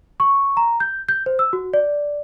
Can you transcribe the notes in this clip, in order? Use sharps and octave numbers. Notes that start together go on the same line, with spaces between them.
C#6
A#5
G6
G6
C5
E6
F#4
D5